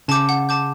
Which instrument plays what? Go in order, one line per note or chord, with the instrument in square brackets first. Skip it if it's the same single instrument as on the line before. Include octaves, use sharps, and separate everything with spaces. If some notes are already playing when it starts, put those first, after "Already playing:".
[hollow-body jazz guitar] C#3 [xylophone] A5 D6 G6
[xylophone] F#5
A5 D6 G6